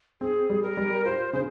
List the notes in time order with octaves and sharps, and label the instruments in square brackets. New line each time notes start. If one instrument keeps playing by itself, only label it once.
[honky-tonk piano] C4 [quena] G#4
[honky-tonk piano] G3
[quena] A#4
[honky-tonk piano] G3
[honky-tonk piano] F4 [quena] C5
[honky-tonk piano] C#3 [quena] C5